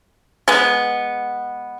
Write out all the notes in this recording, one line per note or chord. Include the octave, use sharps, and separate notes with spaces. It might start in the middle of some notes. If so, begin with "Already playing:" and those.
G#3 B3